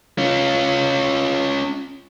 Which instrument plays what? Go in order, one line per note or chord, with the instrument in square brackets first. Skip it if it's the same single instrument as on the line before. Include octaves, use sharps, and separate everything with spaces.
[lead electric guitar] C#4 F4